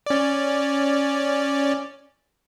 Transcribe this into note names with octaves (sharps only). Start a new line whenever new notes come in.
C#4 D5